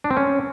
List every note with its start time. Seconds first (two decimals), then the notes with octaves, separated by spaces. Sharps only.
0.04 D4
0.11 C4
0.17 C#4